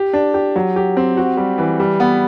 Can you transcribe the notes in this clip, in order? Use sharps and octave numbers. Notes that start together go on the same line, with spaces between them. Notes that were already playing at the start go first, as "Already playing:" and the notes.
Already playing: G4
D4
G4
F#3
G4
C4
F#4
G3
E3
G3
B3